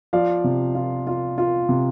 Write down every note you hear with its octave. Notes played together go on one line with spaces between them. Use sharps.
F3 D5 F5
C3
F4
F4
F4
C3